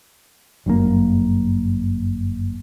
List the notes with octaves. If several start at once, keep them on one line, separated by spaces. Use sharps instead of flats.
G1 F#2 B2 A#3